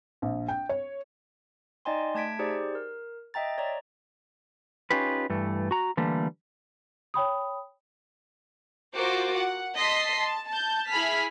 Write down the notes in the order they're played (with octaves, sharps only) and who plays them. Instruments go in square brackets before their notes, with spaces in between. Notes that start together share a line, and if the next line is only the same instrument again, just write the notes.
[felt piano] A#1
G5
C#5
[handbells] D#4 D5 D#5 G5 G#5 C6
A3 A5 G#6 B6 D7
D#4 G4 G#4 C5 D5
A#4
D#5 E5 G5 A#5 A6
C#5 D5 A#5
[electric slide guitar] C#4 D#4 F4 G4 B4
G2 E3 A3
F#4 A#5
D3 E3 G3 A3 A#3
[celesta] C#5 G5 B5 D#6
[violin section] F4 F#4 A#4 C5 D6
F#5
D#5 A5 C6 B6 C7
A5
A5 G6
E4 G#4 B5 F6 B6